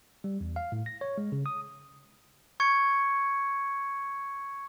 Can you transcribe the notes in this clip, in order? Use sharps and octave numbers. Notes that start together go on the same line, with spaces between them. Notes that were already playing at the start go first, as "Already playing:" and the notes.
G3
E2
F5
A2
A#6
C#5
G#3
C#3
D#6
C#6 G#6 C#7